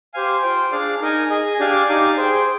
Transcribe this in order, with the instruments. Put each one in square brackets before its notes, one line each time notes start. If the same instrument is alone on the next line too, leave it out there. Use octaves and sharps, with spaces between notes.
[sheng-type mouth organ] G4 C5 F5 G#5
F4 C5 G5
D4 G#4 D5 F5
D#4 A#4 D#5 G#5
G#4 D#5 G#5
D4 G4 D5 F5 G#5
D#4 G4 D5 F5 G#5
G#4 C5 G5